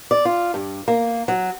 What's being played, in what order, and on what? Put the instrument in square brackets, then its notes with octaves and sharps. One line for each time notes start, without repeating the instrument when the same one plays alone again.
[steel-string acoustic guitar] D5
F4
G2
A#3
F#3